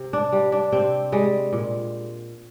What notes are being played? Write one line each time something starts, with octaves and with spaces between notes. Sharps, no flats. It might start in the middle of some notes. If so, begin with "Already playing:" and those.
Already playing: C3
D4
G3
D4
C3 C4
G3 G#3
A#2